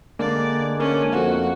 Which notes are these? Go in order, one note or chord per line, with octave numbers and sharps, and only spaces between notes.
D3 G#3 A#3 D4 D5
A#3 C#4
F2 F#4